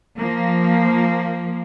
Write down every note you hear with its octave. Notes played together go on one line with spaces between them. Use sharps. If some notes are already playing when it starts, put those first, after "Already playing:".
F3 A#3